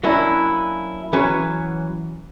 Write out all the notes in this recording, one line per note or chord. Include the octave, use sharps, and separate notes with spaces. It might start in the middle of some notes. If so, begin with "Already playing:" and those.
F#3 A#3 C#4 D4 E4
E3 F#3 C#4 F#4 B4 C#5